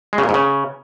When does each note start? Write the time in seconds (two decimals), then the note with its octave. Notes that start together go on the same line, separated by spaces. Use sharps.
0.13 G#3
0.18 C#3
0.24 A#2
0.29 G#2
0.34 C#3